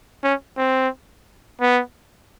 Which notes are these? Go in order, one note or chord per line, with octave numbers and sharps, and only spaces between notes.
C#4
C4
B3